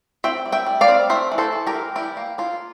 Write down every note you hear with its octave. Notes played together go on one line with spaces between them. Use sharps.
C4 E5 G5
G3
E5 G5
G3
D5 F5
C4
A3 C5 E5
E3
A4 C5
E3
G4 A#4
E3
G3 E4 G4
A#3
A#3 F4